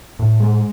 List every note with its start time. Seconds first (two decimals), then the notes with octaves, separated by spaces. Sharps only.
0.19 A2
0.40 G#3